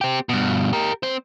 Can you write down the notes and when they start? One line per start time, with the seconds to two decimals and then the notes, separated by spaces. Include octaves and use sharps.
0.01 C4 G4
0.29 G2 B2
0.73 G4 A#4
1.03 C4 C5